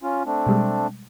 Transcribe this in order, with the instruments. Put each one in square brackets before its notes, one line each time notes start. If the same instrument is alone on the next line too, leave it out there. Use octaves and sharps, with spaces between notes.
[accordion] C#4 F4
A3 C4 D4
[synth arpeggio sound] B2 G3 G#3